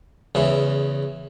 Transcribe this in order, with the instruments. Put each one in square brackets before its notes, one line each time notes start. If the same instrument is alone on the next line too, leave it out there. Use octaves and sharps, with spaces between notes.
[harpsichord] E2 C#3 E3